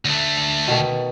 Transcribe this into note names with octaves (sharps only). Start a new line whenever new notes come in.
D2 A3
B2 D#3